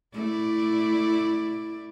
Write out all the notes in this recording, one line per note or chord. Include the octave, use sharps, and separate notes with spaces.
A3 E4 D5